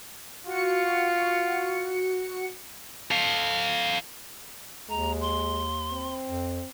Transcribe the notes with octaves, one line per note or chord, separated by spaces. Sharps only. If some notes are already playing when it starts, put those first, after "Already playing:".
F4 F#4 C#7
A4 F5
D#2 G#3 A#5
C6
C4
F2